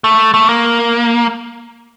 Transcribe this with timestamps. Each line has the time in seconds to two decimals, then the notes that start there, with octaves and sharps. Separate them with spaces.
0.04 A3
0.34 A3
0.49 A#3